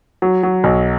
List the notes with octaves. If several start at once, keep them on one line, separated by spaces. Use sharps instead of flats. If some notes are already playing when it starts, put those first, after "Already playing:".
F#3
F#3
B1